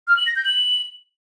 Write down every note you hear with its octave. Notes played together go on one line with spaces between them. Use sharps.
F6
F#7
A#6
G6
F#7